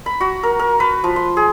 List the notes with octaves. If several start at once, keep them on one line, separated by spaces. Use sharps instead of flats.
B5
F#4
A#4
A#4
B4
F3
C6
G#4